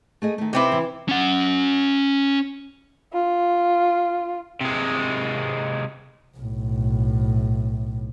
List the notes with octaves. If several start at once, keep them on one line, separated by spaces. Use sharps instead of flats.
A3 G#4 D#5
D#3 A3
C3 C4 D#4 E4 B4
E3
C#4 F#5
F4
C3 G#3
B1 A2